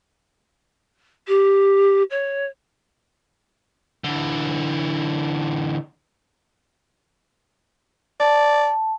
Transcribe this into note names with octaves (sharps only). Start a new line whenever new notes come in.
G4
C#5
D3 E3
D5 A5